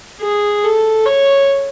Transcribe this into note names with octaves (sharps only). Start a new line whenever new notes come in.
G#4
A4
C#5